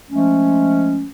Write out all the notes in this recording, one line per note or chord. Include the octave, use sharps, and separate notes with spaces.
F3 G#3 A3 C#4